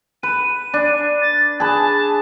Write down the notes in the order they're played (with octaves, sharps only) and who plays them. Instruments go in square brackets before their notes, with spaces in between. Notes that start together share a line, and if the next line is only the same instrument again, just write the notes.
[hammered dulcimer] B4 [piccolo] D#7
[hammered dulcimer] D4
[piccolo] A6
[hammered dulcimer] G#4 B4 [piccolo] A5